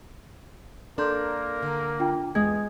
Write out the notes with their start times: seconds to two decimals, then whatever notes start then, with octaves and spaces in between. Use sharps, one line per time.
0.98 A#3 D4 A4 A#4 C6 G6
1.63 D3
2.00 D4 F4 G5
2.35 E2 G#3 D#6 G#6